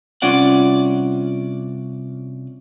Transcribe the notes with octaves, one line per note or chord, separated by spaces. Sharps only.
C2 C#4 F4 D5 F#5